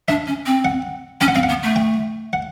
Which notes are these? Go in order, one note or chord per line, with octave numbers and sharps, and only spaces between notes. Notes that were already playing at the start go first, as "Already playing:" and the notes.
D4 E5
C#4
C4
F#5
C#4 G5
F#5
C4 F5
F#5
B3
A3
G5
F#5